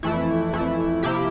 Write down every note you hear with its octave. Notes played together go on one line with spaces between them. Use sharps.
F2 E3 A3 E4
F2 E3 A3 E4
C3 F3 A#3 E4 G4